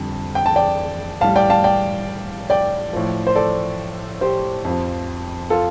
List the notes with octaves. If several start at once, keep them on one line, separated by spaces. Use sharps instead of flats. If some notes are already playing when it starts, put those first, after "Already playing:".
Already playing: F2 D3 G3
G5
A5
D5 G5
A2 G3 F5 A5
D5 G5
F5 A5
D5 G5
D5 G5
A2 F3
C5
A4 D5
G4 C5
F2 F3
F4 A4